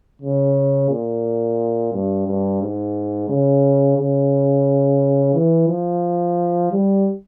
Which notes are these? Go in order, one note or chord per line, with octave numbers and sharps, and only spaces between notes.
C#3
A#2
G2
G2
G#2
C#3
C#3
E3
F3
G3